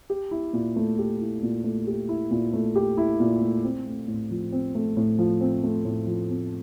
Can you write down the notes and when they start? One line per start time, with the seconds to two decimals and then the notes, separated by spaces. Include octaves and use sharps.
0.10 G4
0.31 E4
0.53 A#2
0.76 A3
0.99 G4
1.21 E4
1.43 A#2
1.64 A3
1.87 G4
2.09 E4
2.31 A#2
2.53 A3
2.76 G4
2.97 E4
3.20 A#2
3.41 A3
3.64 C4
3.86 A3
4.08 A2
4.31 F3
4.52 C4
4.75 A3
4.97 A2
5.19 F3
5.41 C4
5.64 A3
5.85 A2
6.07 F3
6.29 C4